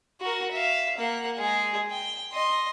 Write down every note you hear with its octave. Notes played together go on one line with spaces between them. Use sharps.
F#4 A#4
E5 F5
A#3 F#5
G#3 G#4
G5
D#5 C6